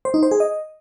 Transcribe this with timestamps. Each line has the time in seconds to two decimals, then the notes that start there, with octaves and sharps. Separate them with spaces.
0.05 C5
0.14 D#4
0.23 C5
0.31 G#4
0.40 D#5